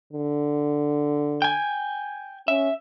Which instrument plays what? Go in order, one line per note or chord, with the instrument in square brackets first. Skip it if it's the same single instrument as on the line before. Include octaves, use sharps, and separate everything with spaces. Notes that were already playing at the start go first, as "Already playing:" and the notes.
[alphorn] D3
[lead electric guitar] G5 G#5
[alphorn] C#4 [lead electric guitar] E5